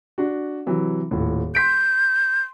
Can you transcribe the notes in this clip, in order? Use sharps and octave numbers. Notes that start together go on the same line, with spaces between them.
D4 F#4
C3 E3 F#3
D#1 A2
C6 G6 B6 D7